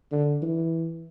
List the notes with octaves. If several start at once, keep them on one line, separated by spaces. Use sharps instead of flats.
D3
E3